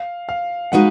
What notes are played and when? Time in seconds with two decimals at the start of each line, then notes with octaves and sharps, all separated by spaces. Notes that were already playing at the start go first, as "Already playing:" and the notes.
Already playing: F5
0.29 F5
0.72 G#3 D#4 F#4 B4 D#5 F#5